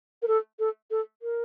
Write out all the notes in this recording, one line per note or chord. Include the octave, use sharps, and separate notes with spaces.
A#4
A4
A4
A4
A#4